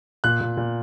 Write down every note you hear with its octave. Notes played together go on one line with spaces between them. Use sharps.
A#2 F#6
A#2
A#2